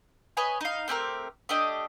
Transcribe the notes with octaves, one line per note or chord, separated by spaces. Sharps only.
B4 C#5 D#5 G#5
D#4 F5
A3 C4 G4 A#4
A3 D4 G4 D#5